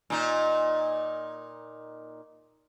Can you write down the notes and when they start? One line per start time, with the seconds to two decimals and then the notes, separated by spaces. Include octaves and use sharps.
0.10 A#2 D#4